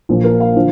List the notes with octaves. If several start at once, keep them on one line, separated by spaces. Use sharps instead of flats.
A#1 A#2 F3
A#4
F5
D3 F3